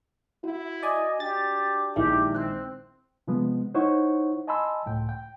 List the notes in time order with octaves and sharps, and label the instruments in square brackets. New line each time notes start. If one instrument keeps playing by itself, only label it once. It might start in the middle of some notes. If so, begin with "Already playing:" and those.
[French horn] E4 [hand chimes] F#4
[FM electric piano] D5 G#5 [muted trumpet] D#5
[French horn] D4 [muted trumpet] G4 [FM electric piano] A6
[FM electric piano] A#1 D#3 G#3 [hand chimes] E4 E5 [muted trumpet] G4
[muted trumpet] C4 [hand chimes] F#6 G6
[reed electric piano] C3 F3 G#3 B3
D#4 E4 C5 C#5 F#5 C#6
D#5 G#5 A5 B5 C6 E6
C#2 A2 G5
G5